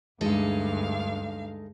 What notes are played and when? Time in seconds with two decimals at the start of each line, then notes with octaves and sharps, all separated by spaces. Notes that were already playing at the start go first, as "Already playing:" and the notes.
0.21 D2 G2 G#3 D#4 A4 F5